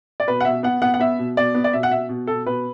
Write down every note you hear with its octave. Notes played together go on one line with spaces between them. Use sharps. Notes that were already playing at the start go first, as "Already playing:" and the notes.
D5
B2 B4
F#5
B2 E5
B3 F#5
B3 F#5
F#5
B3 E5
B2
B2 D5
B3
D5
B2 E5
F#5
B2 E5
B2
B2 A4
B2 B4